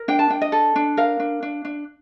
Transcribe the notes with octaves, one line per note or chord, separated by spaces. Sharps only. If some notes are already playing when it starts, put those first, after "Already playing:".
Already playing: A#4
D4 G5
A5
D4 G5
D#5
A4
D4
A#4 F5
D4
D4
D4